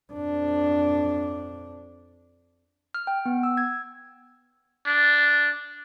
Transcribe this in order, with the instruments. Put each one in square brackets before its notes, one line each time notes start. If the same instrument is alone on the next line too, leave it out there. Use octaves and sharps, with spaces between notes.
[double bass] F2 D4
[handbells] F6
G5
B3
E6
G#6
[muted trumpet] D4